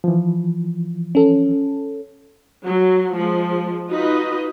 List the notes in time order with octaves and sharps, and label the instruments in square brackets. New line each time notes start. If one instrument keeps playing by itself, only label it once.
[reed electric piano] E3 F3
[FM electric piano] C#4 A4
[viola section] F#3
F3 G#3
D#4 F4 F#4 B4 D#5